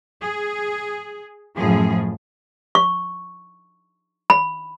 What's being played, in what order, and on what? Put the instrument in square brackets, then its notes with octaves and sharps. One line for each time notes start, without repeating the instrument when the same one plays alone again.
[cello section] G#4
F#2 A2 F3 G#4
[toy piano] C#6
B5